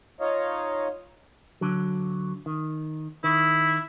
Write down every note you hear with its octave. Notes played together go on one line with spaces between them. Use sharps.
D#4 F4 C#5 D#5 F5
D3 F#3
D#3
D#3 E4